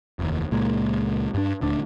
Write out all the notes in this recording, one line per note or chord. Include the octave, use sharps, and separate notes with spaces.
F1 D#2
C#2 A#2 G#3 A#3
G2 D4
D#1 D2 D4